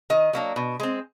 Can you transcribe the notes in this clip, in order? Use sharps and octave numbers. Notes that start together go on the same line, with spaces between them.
D#3 D#5
F#3 A#3 D4
B2
G#3 C4